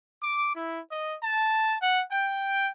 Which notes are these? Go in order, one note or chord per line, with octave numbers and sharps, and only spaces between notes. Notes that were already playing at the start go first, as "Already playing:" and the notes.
D6
E4
D#5
A5
F#5
G5